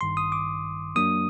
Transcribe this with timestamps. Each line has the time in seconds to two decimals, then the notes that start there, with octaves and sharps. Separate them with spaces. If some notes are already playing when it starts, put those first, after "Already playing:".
0.01 A1 G2 D#3 C6
0.17 D#6
0.32 D6
0.95 F#2 F#3 A#3 D4 D#6